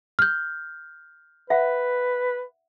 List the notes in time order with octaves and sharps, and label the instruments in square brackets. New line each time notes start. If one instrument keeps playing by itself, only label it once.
[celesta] F6 G6
[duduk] B4 [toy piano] E5 F#5